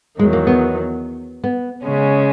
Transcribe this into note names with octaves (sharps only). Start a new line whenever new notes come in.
E2 D#3 F#3 G#3
A#3
B3
B3
C#3 G#3 C#4